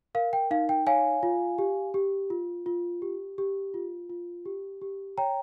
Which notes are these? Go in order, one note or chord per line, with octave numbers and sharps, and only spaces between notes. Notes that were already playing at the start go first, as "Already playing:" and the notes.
A#4 F5
G5
D#4 F5
G5
C#5 F5 G#5
F4
G4
G4
F4
F4
G4
G4
F4
F4
G4
G4
C#5 G5 A#5